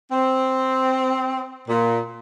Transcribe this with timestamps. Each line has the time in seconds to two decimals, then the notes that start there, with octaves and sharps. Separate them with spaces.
0.11 C4
1.69 A#2